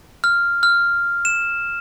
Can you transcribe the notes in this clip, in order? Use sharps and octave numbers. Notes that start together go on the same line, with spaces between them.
F6
F6
E7